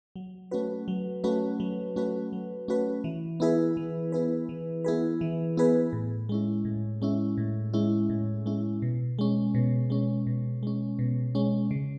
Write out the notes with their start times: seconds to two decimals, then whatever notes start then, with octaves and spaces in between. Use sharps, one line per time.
0.16 F#3
0.51 A3 C#4 F#4 B4
0.88 F#3
1.24 A3 C#4 F#4 B4
1.60 F#3
1.96 A3 C#4 F#4 B4
2.33 F#3
2.68 A3 C#4 F#4 B4
3.04 E3
3.40 B3 E4 G#4 B4
3.77 E3
4.12 B3 E4 G#4 B4
4.49 E3
4.84 B3 E4 G#4 B4
5.21 E3
5.57 B3 E4 G#4 B4
5.93 A2
6.29 G#3 C#4 E4
6.65 A2
7.02 G#3 C#4 E4
7.37 A2
7.73 G#3 C#4 E4
8.10 A2
8.46 G#3 C#4 E4
8.82 B2
9.19 G#3 C#4
9.55 B2
9.90 G#3 C#4
10.27 B2
10.63 G#3 C#4
10.99 B2
11.35 G#3 C#4
11.71 C#3